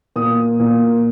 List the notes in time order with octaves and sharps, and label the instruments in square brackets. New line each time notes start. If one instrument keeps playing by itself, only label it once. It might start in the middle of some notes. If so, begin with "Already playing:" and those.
[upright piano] A#2 D#6
A#2